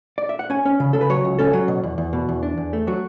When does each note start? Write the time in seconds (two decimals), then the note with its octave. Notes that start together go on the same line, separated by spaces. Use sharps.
0.18 D5
0.29 E5
0.39 F#5
0.50 C#4 G#5
0.65 C#4
0.80 C#3
0.93 C#3 A4
1.01 B4
1.10 F#3 C#5
1.25 C#2
1.39 C#4 A4
1.53 F#3
1.68 B2
1.83 E2
1.98 E2
2.13 B2
2.29 E2
2.43 D4
2.57 E2
2.73 A3
2.87 F#3 F#4